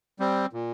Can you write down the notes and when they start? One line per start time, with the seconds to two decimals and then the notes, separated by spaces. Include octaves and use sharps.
0.19 G3 C4
0.53 A#2